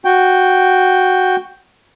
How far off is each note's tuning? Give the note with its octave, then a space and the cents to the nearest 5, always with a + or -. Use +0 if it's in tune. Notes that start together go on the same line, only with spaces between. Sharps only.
F#4 +0 G5 +0